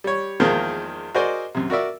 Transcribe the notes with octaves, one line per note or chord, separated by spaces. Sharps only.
G3 C#5
E2 D#3 F3 G#3 A#3
F#4 G#4 A#4 C5 D5 D#5
F#2 C3
F#4 A#4 D5 E5